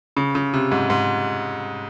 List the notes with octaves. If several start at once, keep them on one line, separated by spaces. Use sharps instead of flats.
C#3
C#3
C3
G#2
G#2